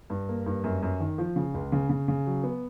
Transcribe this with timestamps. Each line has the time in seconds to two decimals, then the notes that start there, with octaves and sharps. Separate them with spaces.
0.10 G2
0.29 A#3
0.46 G2
0.64 F#2
0.83 F#2
1.00 D#3
1.18 F3
1.36 C#3
1.54 C#2
1.72 C#3
1.89 C#3
2.08 C#3
2.26 F#3
2.44 B3